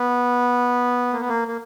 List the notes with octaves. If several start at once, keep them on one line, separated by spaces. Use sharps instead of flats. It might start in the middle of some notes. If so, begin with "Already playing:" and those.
Already playing: B3
A#3
B3
A#3
A#3